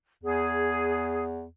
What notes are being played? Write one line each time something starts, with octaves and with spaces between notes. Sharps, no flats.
E2 G#4